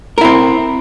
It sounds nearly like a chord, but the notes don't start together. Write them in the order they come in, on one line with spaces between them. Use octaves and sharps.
A#4 E4 C4